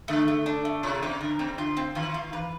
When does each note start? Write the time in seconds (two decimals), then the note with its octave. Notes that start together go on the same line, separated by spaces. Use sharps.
0.08 D3 A3
0.28 A3
0.46 D4
0.65 A3
0.83 C3 F4
1.02 C#3 C4
1.21 D3 A#4
1.39 C#3 C4
1.58 D3 F4
1.77 C4
1.95 D#3 F4
2.14 F4
2.32 E3 B4